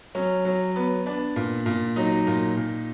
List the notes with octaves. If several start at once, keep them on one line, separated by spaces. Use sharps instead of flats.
F#3 C#4
F#3
B3
B3 D4
A#2
A#2
F#3 D#4
A#2
A#2